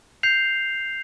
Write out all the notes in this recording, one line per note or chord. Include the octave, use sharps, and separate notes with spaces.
G6 C7 F7